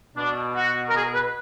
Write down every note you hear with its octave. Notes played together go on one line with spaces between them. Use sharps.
B2 D4
F#4
A#4
G#4
B4